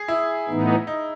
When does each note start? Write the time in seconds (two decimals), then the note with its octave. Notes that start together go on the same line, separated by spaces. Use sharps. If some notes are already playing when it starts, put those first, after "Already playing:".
Already playing: G#4
0.08 E4
0.48 A2 E3 B3 D#4
0.87 D#4